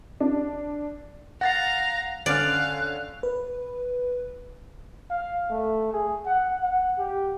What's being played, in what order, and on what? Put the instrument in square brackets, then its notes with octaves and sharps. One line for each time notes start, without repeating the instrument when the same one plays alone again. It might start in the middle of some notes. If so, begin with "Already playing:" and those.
[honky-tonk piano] D4
[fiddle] F5 A#5 [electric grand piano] F#5 A6 C7 [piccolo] A#6
[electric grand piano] D3 C#4 F6 [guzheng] D5 [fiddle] F5 [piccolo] F#6
[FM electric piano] B4
[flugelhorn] F5
A3
G#4
F#5
F#5
G4